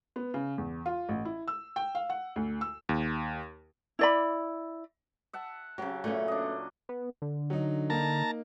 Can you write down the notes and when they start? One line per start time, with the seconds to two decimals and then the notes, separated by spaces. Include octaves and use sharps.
0.16 B3
0.34 C#3
0.58 E2
0.86 F4
1.09 A1
1.25 E4
1.48 E6
1.76 G5
1.95 F5
2.10 F#5
2.36 D2
2.61 E6
2.89 D#2
3.99 E4 D5 B5
5.33 E5 F#5 A5
5.78 C#3 F#3 C4 G4
6.04 A#2 A3 B3 C#4
6.28 D4 D#5
6.89 B3
7.22 D3
7.50 F#3 D#4
7.90 A#3 D#4 A5 A#5